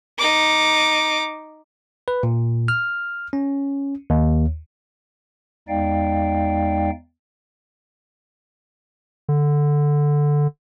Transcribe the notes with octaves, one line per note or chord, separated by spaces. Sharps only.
D#4 D6
B4
A#2
F6
C#4
D#2
E2 G#3 D#4 D5 F5 G5
D3